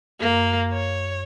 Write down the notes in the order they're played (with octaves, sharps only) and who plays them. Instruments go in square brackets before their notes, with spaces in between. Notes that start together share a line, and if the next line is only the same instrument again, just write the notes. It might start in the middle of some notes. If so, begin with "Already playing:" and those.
[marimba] F#2 [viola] A#3
[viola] C#5